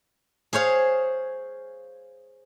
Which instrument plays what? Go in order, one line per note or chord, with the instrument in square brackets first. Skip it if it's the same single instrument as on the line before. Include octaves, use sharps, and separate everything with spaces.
[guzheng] G#4 C5 C#5 F5